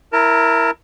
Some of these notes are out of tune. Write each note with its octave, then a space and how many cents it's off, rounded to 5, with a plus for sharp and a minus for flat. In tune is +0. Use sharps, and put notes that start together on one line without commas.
E4 +0 A#4 +5 A5 +40